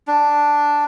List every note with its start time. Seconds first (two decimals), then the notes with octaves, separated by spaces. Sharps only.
0.08 D4